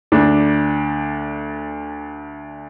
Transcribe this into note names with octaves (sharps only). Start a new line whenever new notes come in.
D2 D4